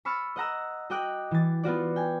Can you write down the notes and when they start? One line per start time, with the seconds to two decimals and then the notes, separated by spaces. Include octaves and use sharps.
0.05 B5 C#6 E6 F6 A6
0.36 D#5 F#5 A#5 E6
0.90 F#4 D#5 G5 D6 F#6
1.31 E3 A6
1.63 B3 F4 F#4 D5
1.96 G5 G#5